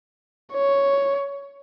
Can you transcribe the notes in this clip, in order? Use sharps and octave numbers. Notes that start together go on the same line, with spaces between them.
C#5